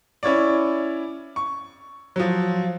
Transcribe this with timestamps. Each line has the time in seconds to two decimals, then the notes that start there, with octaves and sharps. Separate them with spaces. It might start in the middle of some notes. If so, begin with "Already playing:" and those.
0.23 C#4 E4 C#5 D5
1.36 C#6
2.16 F3 F#3